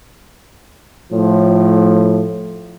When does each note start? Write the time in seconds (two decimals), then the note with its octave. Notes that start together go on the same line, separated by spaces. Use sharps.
1.13 A2 F3